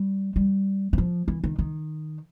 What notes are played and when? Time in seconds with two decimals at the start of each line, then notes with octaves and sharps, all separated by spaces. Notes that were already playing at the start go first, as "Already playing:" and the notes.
Already playing: G3
0.36 G3
0.93 E3
0.98 F3
1.28 E3
1.44 D#3
1.59 D#3